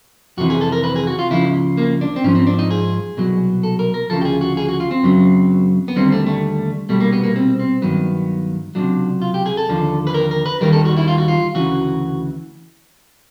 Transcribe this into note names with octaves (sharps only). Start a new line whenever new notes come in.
F2 C3 E3 F#4
G#4
A4
A#4
B4
G#4
F#4
F4
C#2 C#3 F3 E4
A#3
D4
C4
G#2 F3 C#4
C4
D4
D#4
G#4
C2 B2 F#3
A4
A#4
A#4
D2 C#3 F3 A4
G4
G#4
F#4
G#4
F#4
F4
C4
F#2 C#3 F#3
B3
D#2 D3 G3 C4
A3
A3
C2 B2 G3 A3
A#3
B3
A#3
C4
C4
G2 D#3 F#3 B3
C#2 C3 D#3 F#3 D4
F4
G4
G#4
A4
D#2 D3 F3
B4
A#4
A#4
B4
D#2 D#3 G3 A#4
A4
F#4
E4
F4
F#4
F4
D2 C#3 E3 F#4